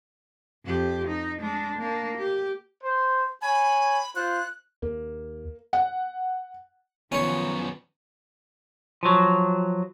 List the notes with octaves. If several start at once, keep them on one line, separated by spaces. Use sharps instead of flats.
F2 G4
D#4
G#3 D4
A#3 D4
G4
C5
C#5 G#5 B5
F4 C5 F#6
D#2 A#3
F#5
F#2 D#3 F3 B3 C#4 C#5
F3 F#3